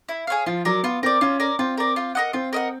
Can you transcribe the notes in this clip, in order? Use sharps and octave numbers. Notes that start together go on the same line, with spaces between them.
E4
G#4 C#5 F5
F3 F4
F#3 A#4 D5
B3 F4
C4 A#4 D5
C#4 F4
A#4 D5
C4 F4
A#4 D5
F4
A#4 D#5 F#5
C4 F4
A#4 D#5 F#5